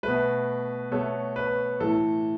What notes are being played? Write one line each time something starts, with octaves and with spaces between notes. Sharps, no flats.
B2 A3 B4
B2 A3 A4 C#5
B4
A2 E3 A3 A4